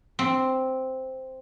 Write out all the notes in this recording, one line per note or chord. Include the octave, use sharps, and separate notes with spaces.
C4